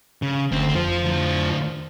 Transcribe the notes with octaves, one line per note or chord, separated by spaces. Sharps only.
C#3
F#1 D2 C4
F2 F3 F4 C5
A2 D3